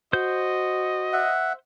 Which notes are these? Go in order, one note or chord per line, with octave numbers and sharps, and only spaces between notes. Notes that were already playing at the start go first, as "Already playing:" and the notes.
F#4 C5 D#5 G6
E5 F#5